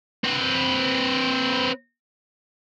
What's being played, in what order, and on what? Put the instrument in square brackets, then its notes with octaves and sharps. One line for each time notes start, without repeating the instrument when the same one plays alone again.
[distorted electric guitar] C4 B4